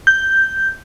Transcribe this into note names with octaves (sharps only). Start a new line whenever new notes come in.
G6